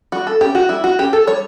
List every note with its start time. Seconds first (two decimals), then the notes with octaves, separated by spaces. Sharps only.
0.12 G3 F#4
0.27 A4
0.41 C#4 G4
0.55 F#4
0.69 G3 E4
0.84 F#4
0.99 C#4 G4
1.13 A4
1.27 G3 C#5